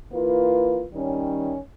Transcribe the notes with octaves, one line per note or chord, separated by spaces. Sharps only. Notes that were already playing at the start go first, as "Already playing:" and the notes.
E3 A#3 F4 B4
D#3 G3 C#4